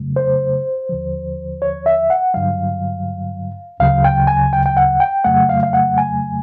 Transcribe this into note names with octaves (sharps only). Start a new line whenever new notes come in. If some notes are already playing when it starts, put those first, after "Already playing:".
Already playing: F2 C#3 F#3 A3
C5
D#2 D3 F3
C#5
E5
F#5
G2 D3 F#3 F5
D2 C#3 F#3 F5
G5
G#5
G5
G5
F#5
G5
F2 C#3 F#3 A3 F#5
F5
F5
F#5
G#5